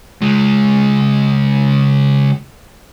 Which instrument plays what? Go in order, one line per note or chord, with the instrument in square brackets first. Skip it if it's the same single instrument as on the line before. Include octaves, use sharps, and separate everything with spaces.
[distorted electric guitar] C#2 G#3